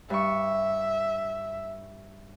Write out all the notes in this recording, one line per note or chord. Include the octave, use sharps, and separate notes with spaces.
G2 E5 C#6